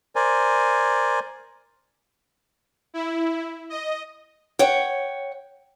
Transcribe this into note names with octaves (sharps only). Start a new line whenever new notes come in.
A#4 C5 D5 G#5
E4
D#5
C#5 F#5 G5